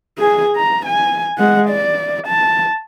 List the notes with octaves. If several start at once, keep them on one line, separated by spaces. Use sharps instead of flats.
G#4 G#5
A#5
G#5
G#3 F#5
D5
A5